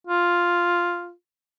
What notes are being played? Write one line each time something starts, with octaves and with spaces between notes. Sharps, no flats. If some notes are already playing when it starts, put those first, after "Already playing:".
F4